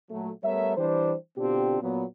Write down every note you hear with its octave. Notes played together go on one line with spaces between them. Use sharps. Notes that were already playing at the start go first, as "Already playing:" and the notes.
A#2 F#3 A3
G3 A3 B3 A#4 C#5 E5
E3 G3 D4 G4 C5
B2 D3 C4 D4 F4 G4
A#2 F#3 B3